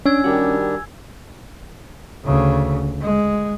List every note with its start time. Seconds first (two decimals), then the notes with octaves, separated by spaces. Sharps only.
0.06 C#4 D4 G#5 E6 G#6
0.24 D#3 G3 D4 F#4 G4
2.24 D2 C#3
3.02 G#3